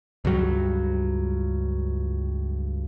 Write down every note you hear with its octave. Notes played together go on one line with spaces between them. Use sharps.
C#2 G2 F#3 G3